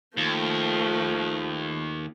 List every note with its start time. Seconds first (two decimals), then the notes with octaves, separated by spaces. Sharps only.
0.17 D#2 F3 A3